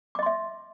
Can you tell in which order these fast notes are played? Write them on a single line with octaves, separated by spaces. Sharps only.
D6 D#5 C6 E5